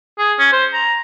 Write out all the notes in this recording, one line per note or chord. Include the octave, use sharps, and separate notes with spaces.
G#4
C#4
C5
A#5